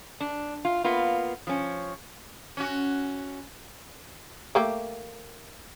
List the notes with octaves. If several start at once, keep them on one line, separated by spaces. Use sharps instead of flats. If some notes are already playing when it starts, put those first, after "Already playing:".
D4
F4
A#3 B3 F4
F3 C#4
C#4 F#4
A3 A#3 G4